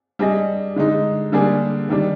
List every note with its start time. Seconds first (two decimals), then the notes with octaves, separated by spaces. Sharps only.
0.19 G3 D4 G#4 D#5
0.76 D3 G#3 D#4
1.32 D3 G3 A#3 D4 G#4
1.89 D#3 G3 D4